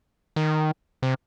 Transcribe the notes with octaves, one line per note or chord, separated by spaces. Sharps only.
D#3
C3